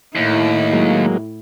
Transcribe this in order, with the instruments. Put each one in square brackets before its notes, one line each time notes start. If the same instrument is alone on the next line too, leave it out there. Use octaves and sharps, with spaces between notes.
[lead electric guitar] D#2 [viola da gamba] A2 E4
[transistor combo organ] F#3 G#3 A#3